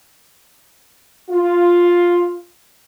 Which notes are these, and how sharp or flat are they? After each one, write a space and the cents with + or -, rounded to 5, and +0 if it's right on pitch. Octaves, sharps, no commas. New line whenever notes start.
F4 +5